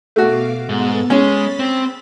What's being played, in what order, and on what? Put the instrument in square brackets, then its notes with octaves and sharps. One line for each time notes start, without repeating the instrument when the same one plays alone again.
[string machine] B2 F5 D6 [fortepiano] A3 F#4
[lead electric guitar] G#2 [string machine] B3 A4 A6
[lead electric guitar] G#3 [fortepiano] C#4 [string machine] B5 A6 B6
[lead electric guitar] C4